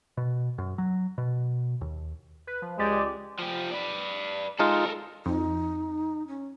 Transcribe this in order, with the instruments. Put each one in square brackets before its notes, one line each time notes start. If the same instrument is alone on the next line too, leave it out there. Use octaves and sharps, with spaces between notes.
[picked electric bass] B2
F#2
F#3
B2
D#2
[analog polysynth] B4
F3
[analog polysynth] C#2 G4 D5 [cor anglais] G#3
[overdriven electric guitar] F3 G4
B4 D5
[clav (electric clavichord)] G#3 D#4 F4 [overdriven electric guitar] A4 A#4
[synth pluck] F2 [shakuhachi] D#4
[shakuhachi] C#4